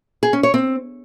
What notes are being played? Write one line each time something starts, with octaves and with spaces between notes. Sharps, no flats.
G#4
C#4
C#5
C4